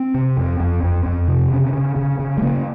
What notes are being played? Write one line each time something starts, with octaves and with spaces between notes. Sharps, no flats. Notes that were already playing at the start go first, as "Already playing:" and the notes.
Already playing: C4
C3
F2
F2
F2
F2
C3
C#3
C#3
C#3
C#3
G#3
C#3 A#3